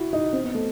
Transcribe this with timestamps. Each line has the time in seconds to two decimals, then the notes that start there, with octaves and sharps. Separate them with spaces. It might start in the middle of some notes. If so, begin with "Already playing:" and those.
Already playing: E4 F#4
0.13 D#4
0.33 C4
0.44 B3
0.54 A3